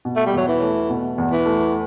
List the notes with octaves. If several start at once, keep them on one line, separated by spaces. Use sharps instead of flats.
B2
A3
G3
E2 F#3
E3
A3
B2
E2
E3
A3